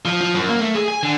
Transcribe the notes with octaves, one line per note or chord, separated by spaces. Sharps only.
F3
F3
F#2
A#3
A3
G#4
G#5
D3